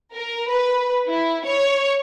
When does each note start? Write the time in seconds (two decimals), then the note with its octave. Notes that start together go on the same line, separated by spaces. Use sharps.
0.12 A#4
0.49 B4
1.07 E4
1.45 C#5